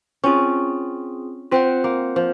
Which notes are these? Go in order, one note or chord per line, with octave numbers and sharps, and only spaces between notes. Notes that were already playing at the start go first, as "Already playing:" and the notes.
C4 C#4 F4 G#4
C4 F4 C5 F#5
A#3
F3